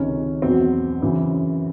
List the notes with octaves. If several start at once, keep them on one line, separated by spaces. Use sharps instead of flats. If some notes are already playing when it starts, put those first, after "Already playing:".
Already playing: C#2 C3 D#3 C#4
E2 B2 F#3 C4
F#2 C#3 E3